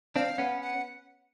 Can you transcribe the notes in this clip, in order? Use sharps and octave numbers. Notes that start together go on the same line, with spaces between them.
C4 D4 F5
B3 C#4 F#5
F#5